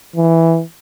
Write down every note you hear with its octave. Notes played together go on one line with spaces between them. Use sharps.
E3